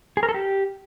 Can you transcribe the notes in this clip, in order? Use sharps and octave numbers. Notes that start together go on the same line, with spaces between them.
G#4
A#4
A4
G4